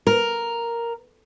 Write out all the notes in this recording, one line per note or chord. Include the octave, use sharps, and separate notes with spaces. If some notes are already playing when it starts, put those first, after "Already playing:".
A#4